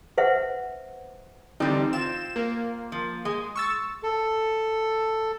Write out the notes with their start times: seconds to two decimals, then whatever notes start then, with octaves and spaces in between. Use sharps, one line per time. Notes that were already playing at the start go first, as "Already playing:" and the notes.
0.18 B4 C5 E5 F#5
1.60 D3 E3 G3 C4 D#4
1.93 C4 F4 E7
2.36 A#3
2.92 F3
3.25 G#3
3.56 C#6 E6 A6
4.03 A4